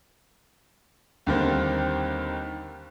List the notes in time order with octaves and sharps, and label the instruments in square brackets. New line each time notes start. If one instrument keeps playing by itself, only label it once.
[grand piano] D#2 D3 D#3 G3 A#3 C4